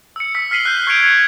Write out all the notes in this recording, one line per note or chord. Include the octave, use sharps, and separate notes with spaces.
E6 C#7
E6 B6
F6 B6 C7 D#7 F#7 G7
F#6 G6
C#6 G6 G#6 C#7 D7 F7
G#6